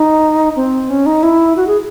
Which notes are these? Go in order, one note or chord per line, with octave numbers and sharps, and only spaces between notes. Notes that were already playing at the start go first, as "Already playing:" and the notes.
Already playing: D#4
C4
C#4
D#4
E4
F#4
G#4